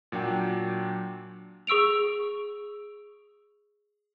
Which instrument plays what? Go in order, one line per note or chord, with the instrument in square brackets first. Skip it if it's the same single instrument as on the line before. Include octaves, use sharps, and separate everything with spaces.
[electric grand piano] A#2 F#3 D4 G5
[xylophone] G#4 C#6 E6 D7 F7